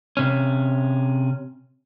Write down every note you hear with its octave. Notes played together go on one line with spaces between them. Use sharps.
C3 C#4